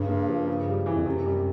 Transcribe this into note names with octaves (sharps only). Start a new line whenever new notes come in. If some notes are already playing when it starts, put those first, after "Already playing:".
Already playing: G2 C#3
A#3
F3
C#3
G3
E3
F2
F#2 C3
G3